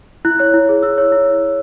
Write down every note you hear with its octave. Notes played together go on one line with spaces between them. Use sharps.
E4 F#6
C#5 F#6
E4
G#4
E4 E6
C#5
E4